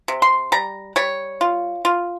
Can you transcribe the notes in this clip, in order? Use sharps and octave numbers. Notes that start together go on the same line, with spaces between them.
C3
C6
G3 A#5
G3 C#5
F4
F4